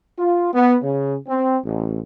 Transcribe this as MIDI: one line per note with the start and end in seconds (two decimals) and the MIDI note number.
0.18 0.50 65
0.54 0.77 59
0.82 1.16 49
1.28 1.59 60
1.65 2.00 33